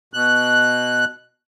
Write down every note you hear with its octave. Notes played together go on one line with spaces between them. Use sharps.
B2 F#6